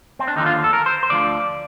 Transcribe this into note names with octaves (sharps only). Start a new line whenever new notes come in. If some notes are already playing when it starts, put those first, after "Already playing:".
C4
D4
D#2 D3 F3 D#4
F4
A4
A#4
C5
C5
D2 D3 F3 D5